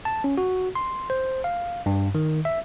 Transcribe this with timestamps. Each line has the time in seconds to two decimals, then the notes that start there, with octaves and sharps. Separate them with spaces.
0.05 A5
0.24 C#4
0.38 F#4
0.75 C6
1.10 C5
1.44 F5
1.86 G2
2.15 D#3
2.45 E5